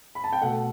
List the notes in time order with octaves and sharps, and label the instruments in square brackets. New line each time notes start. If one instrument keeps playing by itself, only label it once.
[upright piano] B5
A5
G5
B2 A3 F#5